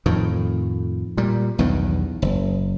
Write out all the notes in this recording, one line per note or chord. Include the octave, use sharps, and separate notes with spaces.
F2 A2 D#3
A#2 G3
B1 E2 G2 D#3
F#1